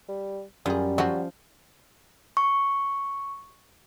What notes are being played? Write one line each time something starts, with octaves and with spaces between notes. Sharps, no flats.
G3
F#2 G3 F4 G#4
F3 F#3 F4 F#4
C#6